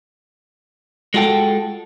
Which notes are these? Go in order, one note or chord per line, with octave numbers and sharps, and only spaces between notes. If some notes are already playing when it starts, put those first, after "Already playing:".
G#3 F4 F#4 A4 G5